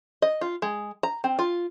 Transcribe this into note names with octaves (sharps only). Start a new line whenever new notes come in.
D#5
F4
G#3
A#5
C4
F4